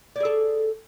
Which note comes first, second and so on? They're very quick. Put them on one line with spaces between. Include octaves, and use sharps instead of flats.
D5 G#4 A4